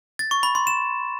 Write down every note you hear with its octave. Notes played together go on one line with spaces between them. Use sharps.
A6
C#6
B5
C6
E7